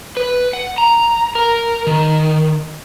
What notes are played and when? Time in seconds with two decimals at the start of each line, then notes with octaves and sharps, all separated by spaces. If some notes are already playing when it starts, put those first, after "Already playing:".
0.17 B4
0.53 F#5
0.78 A#5
1.35 A#4
1.87 D#3